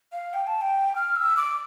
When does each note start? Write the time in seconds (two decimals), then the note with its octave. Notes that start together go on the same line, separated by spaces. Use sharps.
0.12 F5
0.33 G5
0.47 A5
0.61 G5
0.95 F6
1.16 E6
1.37 D6